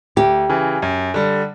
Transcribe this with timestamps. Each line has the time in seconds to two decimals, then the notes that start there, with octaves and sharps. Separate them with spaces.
0.16 D2 G4
0.49 C#3 E3
0.82 F#2
1.14 D3 G3